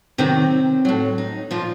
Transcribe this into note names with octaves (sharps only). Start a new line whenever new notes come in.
C3 D#3 F#3 C4
A2 F#3
D#4
A#2 F3 F4